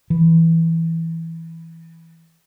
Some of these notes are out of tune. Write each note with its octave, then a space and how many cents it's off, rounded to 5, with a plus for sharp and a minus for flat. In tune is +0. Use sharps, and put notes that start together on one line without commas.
E3 -5